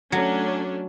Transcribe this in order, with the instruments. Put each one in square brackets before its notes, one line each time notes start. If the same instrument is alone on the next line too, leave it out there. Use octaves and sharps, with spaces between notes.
[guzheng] F#3 [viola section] A3 C#4 D4